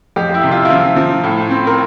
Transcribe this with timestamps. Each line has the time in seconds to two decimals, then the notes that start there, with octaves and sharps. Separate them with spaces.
0.16 F2 G4
0.34 E4
0.43 C3
0.51 F4
0.65 E4
0.70 F3 F4
0.96 F3
1.24 A2
1.51 C4
1.67 A#4